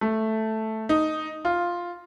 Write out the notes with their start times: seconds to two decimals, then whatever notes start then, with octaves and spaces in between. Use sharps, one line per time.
0.01 A3
0.89 D#4
1.45 F4